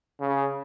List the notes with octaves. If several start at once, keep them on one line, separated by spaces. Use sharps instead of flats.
C#3